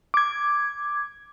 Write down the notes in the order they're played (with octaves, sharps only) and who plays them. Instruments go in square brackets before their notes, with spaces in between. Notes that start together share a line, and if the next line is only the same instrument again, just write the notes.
[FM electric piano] D6 G#6